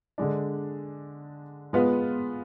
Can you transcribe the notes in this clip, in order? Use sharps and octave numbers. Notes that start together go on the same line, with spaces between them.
D3 G#3 D4
G#3 B3 F4 B4